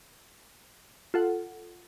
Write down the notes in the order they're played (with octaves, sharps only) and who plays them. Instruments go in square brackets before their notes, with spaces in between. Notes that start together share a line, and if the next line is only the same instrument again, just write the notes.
[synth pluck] F4 A4 F#5